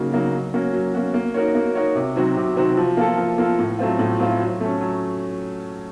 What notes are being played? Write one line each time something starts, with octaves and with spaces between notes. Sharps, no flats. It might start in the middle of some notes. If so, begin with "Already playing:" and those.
Already playing: C#3 F#3 A#3 D#4 F#4
F#3 A#3 D#4 F#4
F#3
A#3 C#4 F#4
F#3
A#3 C#4 F#4
A#3
D#4 F#4 A#4 C#5
A#3
D#4 F#4 A#4 C#5
C3
D#3 F#3 C4 F#4
C3
D#3 F#3 C4 F#4
F3
A#3 F4 A4
F3
A#3 F4 A4
A2
F#3 A3 C4 F4
A2
F#3 A3 C4 F4
F#3
A3 C#4
F#3